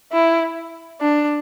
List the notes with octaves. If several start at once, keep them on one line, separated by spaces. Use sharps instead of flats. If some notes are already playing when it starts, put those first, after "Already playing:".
E4
D4